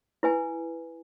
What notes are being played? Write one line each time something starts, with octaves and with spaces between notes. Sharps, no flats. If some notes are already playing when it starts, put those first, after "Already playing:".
E4 B4 G#5